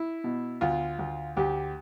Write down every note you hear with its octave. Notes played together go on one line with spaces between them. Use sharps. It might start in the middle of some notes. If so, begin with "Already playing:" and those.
Already playing: E4
B2
D2 F4
D2
D2 G4